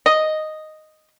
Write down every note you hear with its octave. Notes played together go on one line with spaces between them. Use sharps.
D#5